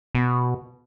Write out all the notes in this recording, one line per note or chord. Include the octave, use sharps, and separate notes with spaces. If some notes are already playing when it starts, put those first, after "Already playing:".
B2